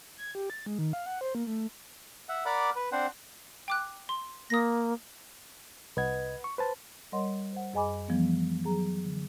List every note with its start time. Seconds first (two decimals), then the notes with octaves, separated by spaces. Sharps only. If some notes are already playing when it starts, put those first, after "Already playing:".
0.18 G#6
0.35 G4
0.50 A6
0.66 G#3
0.79 D#3
0.93 F5
1.06 F#5
1.21 C5
1.35 A#3
1.47 A3
2.29 E5 F#5
2.46 A#4 D5 F#5 B5 D6
2.76 B4
2.92 C4 D4 C5 F#5
3.68 G5 D6 F#6
4.09 C6
4.50 A#3 D#6 A#6
5.97 C2 B4 D#5 F#5 G#6
6.44 C#6
6.58 B4 C5 A5
7.12 G3 A#4 C#5 D#5 F#5 C6
7.53 C5 F#5
7.74 F#2 G#4 D#5 G#5 B5 D6
8.08 E3 F3 G3 A3 B3
8.64 F#3 G#4 A#5
9.04 D3